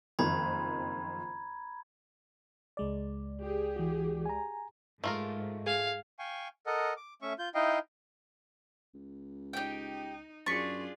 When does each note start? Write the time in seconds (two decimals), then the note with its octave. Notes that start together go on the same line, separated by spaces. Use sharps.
0.19 F#1 F2 D#3 A#5 B5 G#6
2.77 C#2 G#3 D5
3.42 G4 G#4
3.76 E3 F#4
4.26 G#5 A#5
5.04 G#2 A3 F4 A#4
5.67 G#4 F5
6.19 F5 G5 G#5 C#6
6.66 A4 A#4 D#5 F#5
6.97 D6
7.22 A3 C#4 E5 C#6
7.39 F4 G6
7.55 D#4 E4 D#5 F5 G5
8.94 C#2
9.53 D#4 G4 G5
10.46 F#2 D4 F4 G#4 C#6 A6 B6